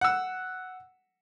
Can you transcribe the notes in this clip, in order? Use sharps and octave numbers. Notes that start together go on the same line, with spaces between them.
F#5 E6